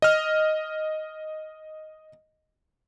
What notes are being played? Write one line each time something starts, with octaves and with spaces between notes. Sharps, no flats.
D#5 F6